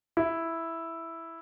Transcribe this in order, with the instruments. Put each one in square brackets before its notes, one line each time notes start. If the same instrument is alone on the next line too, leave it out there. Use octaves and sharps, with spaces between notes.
[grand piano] E4